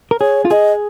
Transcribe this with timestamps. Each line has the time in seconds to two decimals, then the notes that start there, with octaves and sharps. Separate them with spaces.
0.11 A#4
0.20 G#4 C#5
0.45 F4
0.51 G#4 D#5